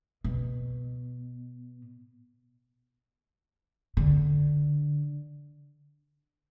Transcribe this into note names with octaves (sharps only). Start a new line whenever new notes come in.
B2
D3